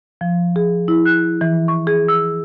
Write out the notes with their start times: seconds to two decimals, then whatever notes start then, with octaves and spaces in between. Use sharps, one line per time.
0.21 F3
0.56 G#4
0.88 E4
1.06 F#6
1.41 E3
1.68 C#6
1.87 G#4
2.08 E6